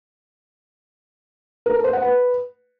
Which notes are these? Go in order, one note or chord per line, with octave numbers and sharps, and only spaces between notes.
A#4
A4
C5
F#5
B4